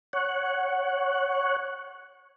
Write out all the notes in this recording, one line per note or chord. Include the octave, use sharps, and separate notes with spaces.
C#5 F#5